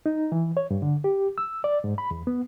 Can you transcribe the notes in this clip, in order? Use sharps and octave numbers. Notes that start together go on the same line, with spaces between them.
D#4
E3
C#5
G2
D3
G4
E6
D5
G#2
B5
E2
B3